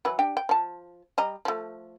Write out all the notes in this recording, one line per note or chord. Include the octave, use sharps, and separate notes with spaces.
E3 F#3 B4
D4 G4 G5
G5
F3 A5
G3 D#5 A#5
F3 A3